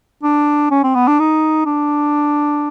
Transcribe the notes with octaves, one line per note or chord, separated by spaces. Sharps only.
D4
C#4
C4
B3
D4
D#4
D4